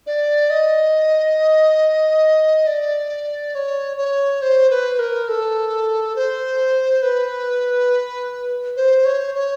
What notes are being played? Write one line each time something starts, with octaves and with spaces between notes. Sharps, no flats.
D5
D#5
D5
C#5
C#5
C5
B4
A#4
A4
C5
B4
C5
C#5
C#5